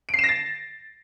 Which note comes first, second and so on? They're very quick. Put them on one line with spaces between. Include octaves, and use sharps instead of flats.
D7 C7 E7 A#6 A6